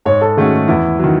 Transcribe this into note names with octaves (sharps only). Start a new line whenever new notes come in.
G#2 C#5
A4
D#3 A3 C#4 F#4 G#4
E2 E4
D#3 F#3